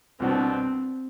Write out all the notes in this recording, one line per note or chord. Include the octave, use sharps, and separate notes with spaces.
C2 B2 B3 C4 D4